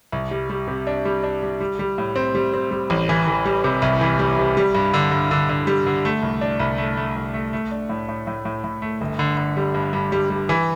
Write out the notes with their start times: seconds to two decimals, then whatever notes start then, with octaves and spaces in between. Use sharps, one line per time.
0.12 C2
0.31 G3
0.50 G3
0.68 C3
0.87 D4
1.05 G3
1.23 D4
1.43 G3
1.61 G3
1.79 G3
1.98 A2
2.16 C4
2.35 G3
2.54 C4
2.71 G3
2.90 A1
3.09 E3
3.28 E3
3.45 G3
3.64 C3
3.82 C2
4.01 E3
4.19 G3
4.39 C3
4.57 G3
4.75 G2
4.94 D3
5.12 G2
5.31 D3
5.49 D3
5.67 G3
5.86 D3
6.05 A3
6.23 C2
6.41 D4
6.60 C2
6.78 A3
6.97 A3
7.16 C2
7.34 A3
7.53 A3
7.71 D4
7.89 A2
8.09 A2
8.27 A2
8.45 A2
8.64 A2
8.82 A3
9.01 G1
9.19 D3
9.37 D3
9.57 G3
9.74 G2
9.93 G2
10.12 G3
10.30 G3
10.49 E3